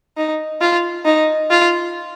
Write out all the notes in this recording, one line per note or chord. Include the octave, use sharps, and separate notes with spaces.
D#4
F4
D#4
F4